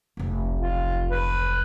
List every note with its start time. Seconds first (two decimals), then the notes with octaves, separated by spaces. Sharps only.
0.17 F1 B1
0.61 F4
1.11 B4